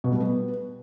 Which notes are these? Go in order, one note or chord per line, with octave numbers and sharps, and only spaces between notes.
B2
G3
B3